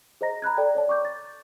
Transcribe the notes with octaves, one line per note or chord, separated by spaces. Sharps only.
G#4 C5 D#5 A#5 A#6
A#5 B5 F#6 G#6
A4 D5 G5
C#5 D5 A5
D5 C#6 D6 G6
A6